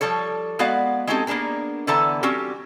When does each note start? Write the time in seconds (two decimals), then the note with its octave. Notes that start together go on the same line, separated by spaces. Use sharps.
0.01 F3 G3 A4 C#5
0.59 G#3 B3 F#4 D5 F5
1.07 G#3 C4 C#4 D#4 G4 A4
1.27 A#3 B3 D4 G#4 A#4
1.87 D3 E3 B3 A4 D5 A#5
2.23 G3 C4 C#4 F#4 G4